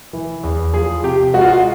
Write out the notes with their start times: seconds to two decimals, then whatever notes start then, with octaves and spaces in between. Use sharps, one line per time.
0.13 E3
0.44 E2
0.73 F3 G#4
1.03 C3 G4
1.34 G#3 F#4
1.41 F4
1.48 F#4